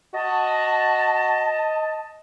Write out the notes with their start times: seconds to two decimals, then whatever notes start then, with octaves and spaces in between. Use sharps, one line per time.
0.15 F#4 D#5 A5